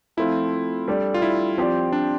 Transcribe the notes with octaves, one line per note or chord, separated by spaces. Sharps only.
F3 A3 C4 E4 F4
G3 D4 A4 D5
F4
E4
F3 C4 G4 D5
D4